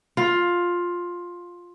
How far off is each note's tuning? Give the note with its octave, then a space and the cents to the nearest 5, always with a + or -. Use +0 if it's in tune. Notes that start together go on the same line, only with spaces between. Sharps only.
F4 +10